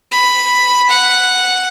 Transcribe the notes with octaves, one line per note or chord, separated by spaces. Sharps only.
B5
F#5